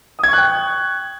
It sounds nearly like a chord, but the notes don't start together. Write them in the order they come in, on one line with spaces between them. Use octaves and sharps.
D#6 G#6 C#6 F#6 G5